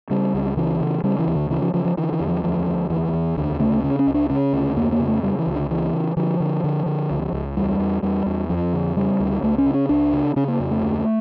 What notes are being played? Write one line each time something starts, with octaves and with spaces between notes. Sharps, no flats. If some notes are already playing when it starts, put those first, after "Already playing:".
C#3 G3
C#2
C#3 E3
C#3
C#3 G3
E3
D2
D3
C#3 E3
F3
C#3 F3
F3
D3 E3
E3
E2
F3
D2 F3
D2
E2 E3
E2
D2 D3
C#3 A3
C#3 C#4
C#4
C#2
D4
C#3 C#4
D2
F2 A#3
A#3
C#3
A3
C#3 G3
E3
C#2
D3
C#3 E3
C#3
D3 F3
D3
D3
D3
C#2
C#2
E2 G3
E2
E2 G3
E2
F2 F3
D3
C#3 G3
D2
C#2 A3
C#4
C#3
C#4
C#2 D4
C#3
C#3 C#4
A#3
F2
A3
D2